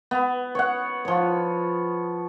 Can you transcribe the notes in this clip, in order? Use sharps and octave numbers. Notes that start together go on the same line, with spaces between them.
B3
C#5 F#5
F3 C#5